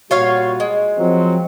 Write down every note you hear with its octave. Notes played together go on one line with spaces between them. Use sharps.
A#2 G3 F4 F#4 C#5 F5
G#3
F3 F#3 C4